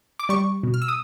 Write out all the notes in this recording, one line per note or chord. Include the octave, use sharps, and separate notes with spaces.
D6
G3 C#6
B2
F6
E6
D#6